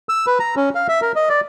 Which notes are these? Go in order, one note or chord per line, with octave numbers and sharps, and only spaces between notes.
E6
B4
A#5
C#4
F5
E5
A#4
D#5
D5